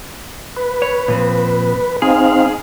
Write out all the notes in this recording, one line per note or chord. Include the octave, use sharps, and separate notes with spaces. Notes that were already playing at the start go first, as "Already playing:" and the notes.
B4
C#5
A#2 F3 C4
C4 D#4 G#4 F5